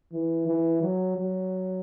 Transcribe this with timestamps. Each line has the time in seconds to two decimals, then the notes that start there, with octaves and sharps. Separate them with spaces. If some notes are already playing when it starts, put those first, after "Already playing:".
0.12 E3
0.47 E3
0.82 F#3
1.17 F#3